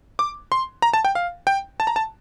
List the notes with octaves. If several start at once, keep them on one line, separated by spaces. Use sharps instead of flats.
D6
C6
A#5
A5
G5
F5
G5
A5
A#5
A5